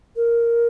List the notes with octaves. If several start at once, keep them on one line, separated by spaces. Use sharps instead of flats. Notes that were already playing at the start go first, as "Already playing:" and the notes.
A#4